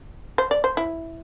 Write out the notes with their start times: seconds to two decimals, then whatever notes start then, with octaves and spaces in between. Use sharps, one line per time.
0.38 C5
0.51 D5
0.64 C5
0.77 E4